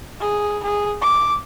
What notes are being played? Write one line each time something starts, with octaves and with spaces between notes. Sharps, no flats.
G#4
G#4
D6